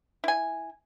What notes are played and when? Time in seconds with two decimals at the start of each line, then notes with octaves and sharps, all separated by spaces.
0.24 E4 G#5